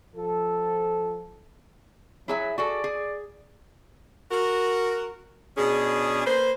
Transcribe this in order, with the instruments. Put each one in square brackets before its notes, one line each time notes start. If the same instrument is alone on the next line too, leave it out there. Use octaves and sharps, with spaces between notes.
[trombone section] F3 A4
[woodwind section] F#3 [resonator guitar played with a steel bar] E4 G#4 E5
[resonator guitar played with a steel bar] F#4 G#4 A4 [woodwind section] D5
[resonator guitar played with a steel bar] G#4
[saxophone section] F#4 A#4
B2 C#4 D4 G#4
A#3 B4 C5